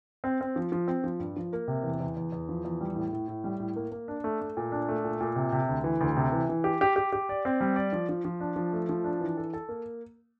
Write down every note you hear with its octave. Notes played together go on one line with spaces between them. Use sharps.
C4
C4
F3
F3
C4
F3
G2
F3
A#3
C3
E2
E2
E2
E2
F3
E2
G3
A2
A2
A2
G3
A2
A#3
A#3
D4
A3
A3
A#2
D4
A3
A#2
A#2
C3
C3
D2
E3
D2
C3
E3
E3
G4
G4
G4
G4
D5
C4
G3
D5
F3
F3
F3
D4
F3
A3
F3
D4
E3
A4
A4
A#3